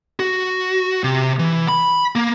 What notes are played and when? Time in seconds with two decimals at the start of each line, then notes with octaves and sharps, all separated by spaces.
0.20 F#4
1.04 C3
1.39 E3
1.68 B5
2.16 A#3